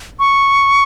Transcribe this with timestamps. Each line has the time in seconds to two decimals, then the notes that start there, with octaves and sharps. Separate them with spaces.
0.19 C#6